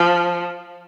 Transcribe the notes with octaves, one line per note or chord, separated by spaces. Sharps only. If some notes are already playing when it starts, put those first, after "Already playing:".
Already playing: F3